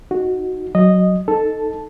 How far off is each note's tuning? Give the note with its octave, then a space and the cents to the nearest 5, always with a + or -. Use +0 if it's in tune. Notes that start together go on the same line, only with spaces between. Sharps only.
D#4 +0 F#4 -5
F#3 +0 D#5 -10
D#4 +0 A4 +0 A5 +0